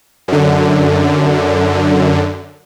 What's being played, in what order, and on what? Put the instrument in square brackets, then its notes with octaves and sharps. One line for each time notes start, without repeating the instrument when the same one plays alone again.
[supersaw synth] F#2 D3